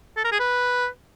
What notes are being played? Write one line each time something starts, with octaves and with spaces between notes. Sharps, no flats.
A4
A#4
G#4
B4